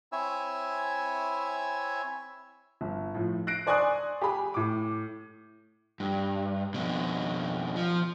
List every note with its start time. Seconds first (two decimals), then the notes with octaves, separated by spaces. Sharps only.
0.12 C4 E4 C#5 E5 G#5 E6
2.81 G1
3.14 A2 F3
3.47 F#6 A#6 C7 D7
3.67 C5 D5 G#5 C#6 D#6 F#6
4.21 G4 G#4 B5
4.54 A2 D6
6.00 G2
6.74 F2 B2
7.76 F3